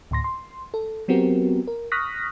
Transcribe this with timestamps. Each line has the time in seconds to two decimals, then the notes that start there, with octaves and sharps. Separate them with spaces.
0.11 D2 A2 C6 A#6
0.24 C6
0.74 A4
1.08 F#3 B3 C4 F#4 G4 A#4
1.67 A#4
1.92 C#6 D#6 F6 F#6 A#6 B6